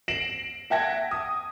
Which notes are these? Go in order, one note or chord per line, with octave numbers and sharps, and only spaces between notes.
A#6 C7 D7 E7 F#7
E5 F#5 G5 A5 G#6 A#6
D#6